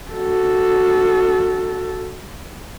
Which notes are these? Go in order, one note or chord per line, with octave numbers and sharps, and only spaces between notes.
F#4 A4